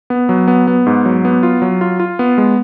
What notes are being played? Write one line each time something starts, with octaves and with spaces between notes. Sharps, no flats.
B3
F#3
B3
B3
G#2
F#3
B3
F4
F#3
F4
F4
B3
G#3